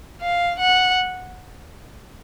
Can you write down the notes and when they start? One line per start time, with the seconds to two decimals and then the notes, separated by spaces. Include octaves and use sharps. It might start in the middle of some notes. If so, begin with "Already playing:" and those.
0.21 F5
0.59 F#5